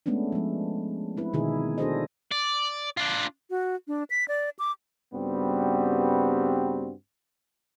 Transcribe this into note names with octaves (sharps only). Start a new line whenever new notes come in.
G#3 A3 B3 C#4 D4
F3 G#3
C4 E4 B4
B2 D3 D#3 D#4 E4 G#4
D4 F#4 G#4 A4 C5 D#5
D5
D4 F4
F#4
D4
B6
D5
D6
G2 C#3 G3 B3 C4 F#4